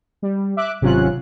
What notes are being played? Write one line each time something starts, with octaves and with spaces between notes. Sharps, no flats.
G3
E5 D6 F#6
G#1 C3 F#3 C#4 F4 F#6